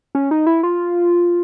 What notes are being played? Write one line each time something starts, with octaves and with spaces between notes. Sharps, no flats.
C#4
D#4
E4
F4